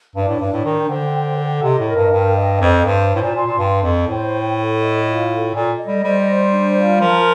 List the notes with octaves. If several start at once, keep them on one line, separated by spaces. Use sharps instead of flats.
G2 D4
A2
G2 D4
A2
D#3 G5
D3 C5
G5
A4
C3 D#5
A2
A#4
G2
G2 G5
D#5
F2 C5
G2 C5
A5
A2
A#2
A#2 C6
A#2
G2 G5
F2 G5
A2 C5
G5
A4
D#5
F4
A4
A#2 A4
D#5
G3
G3 C5
C5
D4
F4
F3 A#4